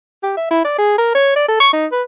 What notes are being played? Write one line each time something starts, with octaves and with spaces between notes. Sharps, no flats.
G4
E5
E4
D5
G#4
A#4
C#5
D5
A4
C#6
D#4
B4